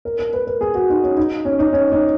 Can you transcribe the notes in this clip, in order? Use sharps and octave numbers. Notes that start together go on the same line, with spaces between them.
A#4
A#4
B4
A#4
G#4
F#4
D#4
C#4
D#4
C#4
D#4
C#4
D#4